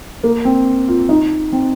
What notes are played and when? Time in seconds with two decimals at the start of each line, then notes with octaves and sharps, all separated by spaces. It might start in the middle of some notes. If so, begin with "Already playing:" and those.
0.24 A#3
0.45 C4
0.88 F4
1.09 D#4
1.53 C4